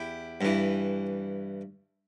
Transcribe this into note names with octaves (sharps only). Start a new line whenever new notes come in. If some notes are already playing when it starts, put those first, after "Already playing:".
Already playing: E2 E4 G4
G2 E3